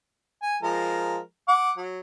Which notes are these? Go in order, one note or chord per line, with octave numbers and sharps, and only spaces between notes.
G#5
F3 G#3 A#4
F#5 D6
F#3